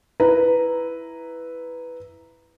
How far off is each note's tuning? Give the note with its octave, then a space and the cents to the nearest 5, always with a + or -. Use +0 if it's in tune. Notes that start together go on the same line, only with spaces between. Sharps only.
E4 +0 B4 +0 A#5 +0